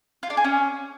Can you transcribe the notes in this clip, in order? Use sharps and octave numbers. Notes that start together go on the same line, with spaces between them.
F4
D4
G#4
C#4